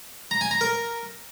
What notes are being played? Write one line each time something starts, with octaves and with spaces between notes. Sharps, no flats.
A#5
G#5
A#5
A#4